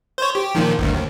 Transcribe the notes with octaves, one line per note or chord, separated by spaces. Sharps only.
C5 C#5
G4
A#2 D#3 F3
G#1 D2 G2
D#2